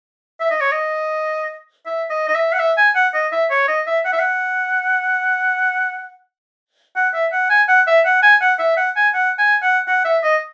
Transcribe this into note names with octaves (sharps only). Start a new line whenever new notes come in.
E5
D#5
C#5
D#5
E5
D#5
D#5
E5
F#5
E5
G#5
F#5
D#5
E5
C#5
D#5
E5
F#5
E5
F#5
F#5
E5
F#5
G#5
F#5
E5
F#5
G#5
F#5
E5
F#5
G#5
F#5
G#5
F#5
F#5
E5
D#5